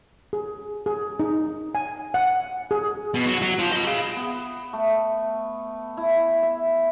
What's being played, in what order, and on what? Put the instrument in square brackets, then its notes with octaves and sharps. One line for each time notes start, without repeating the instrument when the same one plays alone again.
[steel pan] G#4
G#4
D#4
G#5
F#5
G#4
[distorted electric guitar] B2
F#3
F#3
F3
D#5 B5
F5 B5
[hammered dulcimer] B3
A3
E4
E5